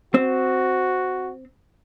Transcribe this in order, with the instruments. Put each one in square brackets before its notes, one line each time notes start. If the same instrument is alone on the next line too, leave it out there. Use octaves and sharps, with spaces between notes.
[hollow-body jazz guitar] C4 [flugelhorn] F#4